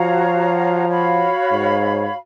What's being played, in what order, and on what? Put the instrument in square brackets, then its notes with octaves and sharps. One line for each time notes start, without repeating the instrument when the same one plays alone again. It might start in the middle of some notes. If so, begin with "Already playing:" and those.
Already playing: [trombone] F3 [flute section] F#4 C#5 F5 A#5
[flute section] F#4 C#5 F5 B5
[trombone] G#2